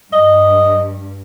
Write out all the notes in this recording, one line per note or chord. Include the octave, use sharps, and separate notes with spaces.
G2 D#5